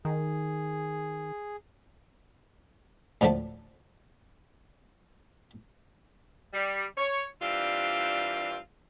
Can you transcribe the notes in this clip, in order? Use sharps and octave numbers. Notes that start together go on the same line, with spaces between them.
D#3 G#4
D2 A2 D3 F3 A3
G3
C#5
E3 G3 C4 D4 F4